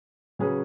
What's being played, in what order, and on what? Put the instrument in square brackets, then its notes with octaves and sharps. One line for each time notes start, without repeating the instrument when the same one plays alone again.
[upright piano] C#3 F#3 C#4 G#4 B4